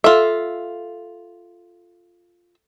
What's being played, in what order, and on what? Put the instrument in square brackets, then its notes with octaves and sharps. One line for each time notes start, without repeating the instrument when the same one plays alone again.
[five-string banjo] F4 E5 [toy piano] A4